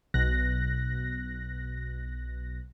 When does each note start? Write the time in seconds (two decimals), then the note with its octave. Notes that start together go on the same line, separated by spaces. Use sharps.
0.14 B1 B2 F#6 A#6